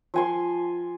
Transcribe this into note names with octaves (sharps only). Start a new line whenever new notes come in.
F3 G#5 C6